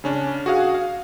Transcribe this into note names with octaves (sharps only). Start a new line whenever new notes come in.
C#3 C#4 D4
F#4 G#4 F5
F5